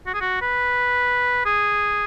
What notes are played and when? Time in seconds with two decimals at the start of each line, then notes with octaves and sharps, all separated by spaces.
0.07 F#4
0.14 G#4
0.21 F#4
0.42 B4
1.46 G#4